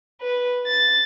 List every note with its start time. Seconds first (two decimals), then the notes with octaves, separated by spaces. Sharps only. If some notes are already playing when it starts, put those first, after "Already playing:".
0.23 B4
0.67 A6